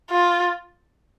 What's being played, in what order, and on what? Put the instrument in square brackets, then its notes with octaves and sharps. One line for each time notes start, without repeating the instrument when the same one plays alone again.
[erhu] F4